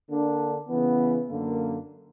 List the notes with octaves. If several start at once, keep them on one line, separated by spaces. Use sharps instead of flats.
D3 A#3 D4
C#3 E3 B3
F#2 D3 A#3